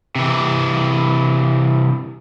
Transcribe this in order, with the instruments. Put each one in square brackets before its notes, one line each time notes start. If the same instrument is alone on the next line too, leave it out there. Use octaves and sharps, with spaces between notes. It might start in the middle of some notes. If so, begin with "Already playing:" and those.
[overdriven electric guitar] C3 E3